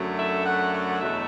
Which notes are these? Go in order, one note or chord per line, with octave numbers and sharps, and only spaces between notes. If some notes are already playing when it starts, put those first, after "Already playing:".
Already playing: F#2 D3 F#3 A3
E5
F#5
F#5
E2 B2 F#3 A3 E5